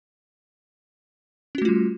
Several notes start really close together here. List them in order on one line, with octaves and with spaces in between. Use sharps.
C#4 F#4 A3 F4 G3